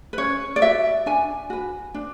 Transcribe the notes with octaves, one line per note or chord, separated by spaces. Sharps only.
B4
C#4 C#5
D5
F#4 B4 E5
D4 G#5
F#4 B4
D4